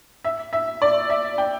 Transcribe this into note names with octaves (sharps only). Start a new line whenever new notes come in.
E5
E5
D5
E5
G5